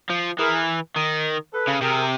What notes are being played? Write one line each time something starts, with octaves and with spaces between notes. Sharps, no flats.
F3
E3 G#4 A#4
D#3
A4 B4
C#3
C3 G#4 A#4